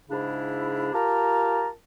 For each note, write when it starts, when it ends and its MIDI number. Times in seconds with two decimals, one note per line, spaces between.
0.10 0.92 44
0.10 0.92 49
0.10 0.92 62
0.10 0.92 64
0.94 1.69 65
0.94 1.69 67
0.94 1.69 70
0.94 1.69 81
0.94 1.69 82